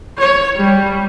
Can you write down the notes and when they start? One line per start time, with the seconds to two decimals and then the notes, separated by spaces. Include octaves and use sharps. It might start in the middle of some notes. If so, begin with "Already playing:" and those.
0.18 C#5
0.57 G3